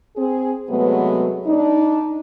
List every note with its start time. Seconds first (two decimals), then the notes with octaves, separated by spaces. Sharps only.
0.17 C4 G#4
0.70 C3 F#3 G#3 A3 B3
1.46 D4 D#4